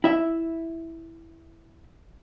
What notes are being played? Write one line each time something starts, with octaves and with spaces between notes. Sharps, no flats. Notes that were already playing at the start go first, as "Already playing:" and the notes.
E4 E5